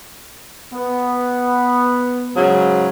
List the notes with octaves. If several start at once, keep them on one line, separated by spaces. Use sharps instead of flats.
B3
G#2 C#3 F#3